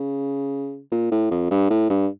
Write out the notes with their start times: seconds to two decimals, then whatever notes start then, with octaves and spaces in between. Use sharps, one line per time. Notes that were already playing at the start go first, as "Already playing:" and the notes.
Already playing: C#3
0.92 A#2
1.11 A2
1.31 F2
1.51 G2
1.70 A2
1.90 G2